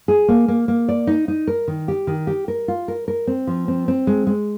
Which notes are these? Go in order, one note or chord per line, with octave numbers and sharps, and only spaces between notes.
G#4
A#3
A#3
A#3
D5
D#4
D#4
A#4
D#3
G4
D#3
G4
A#4
F4
A#4
A#4
C4
F3
C4
C4
G#3
G#3